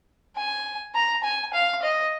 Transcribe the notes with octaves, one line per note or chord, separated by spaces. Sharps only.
G#5
A#5
G#5
F5
D#5